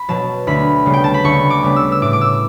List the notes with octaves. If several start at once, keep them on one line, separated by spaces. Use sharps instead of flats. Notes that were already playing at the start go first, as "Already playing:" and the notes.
Already playing: B5
B2 F#3 A5
D2 B5
C#3 G3 B3
G5
A5
B5
D2 C#6
D6
C#3 G3 B3
E6
E6
A2 D6
D6
E6